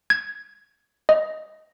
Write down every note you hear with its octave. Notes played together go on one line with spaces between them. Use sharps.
G#6
D#5